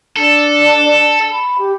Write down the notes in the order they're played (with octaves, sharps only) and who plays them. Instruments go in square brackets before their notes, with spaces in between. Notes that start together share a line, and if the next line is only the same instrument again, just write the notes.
[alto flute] D4 [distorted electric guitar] A4
[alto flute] B5
G4